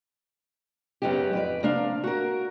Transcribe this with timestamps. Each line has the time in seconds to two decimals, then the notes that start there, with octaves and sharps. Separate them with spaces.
1.02 F#2 C#3 B3 D#4 G4
1.33 F2 B4 D5
1.63 C3 A#3 D4 F5
2.04 F#4 A#4